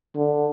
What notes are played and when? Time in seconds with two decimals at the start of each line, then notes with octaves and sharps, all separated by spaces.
0.16 D3